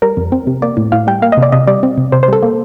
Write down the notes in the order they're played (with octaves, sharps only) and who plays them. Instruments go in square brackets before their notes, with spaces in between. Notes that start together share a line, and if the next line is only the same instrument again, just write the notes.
[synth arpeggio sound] G3 A#4
F2
C4
C3
A#3 D5
A2
A2 F5
G3 G5
A#3 F5
D#5
C3
D5
C3 D#5
G3 D5
C4
C3
C3 C5
C5
G3 A4
A#3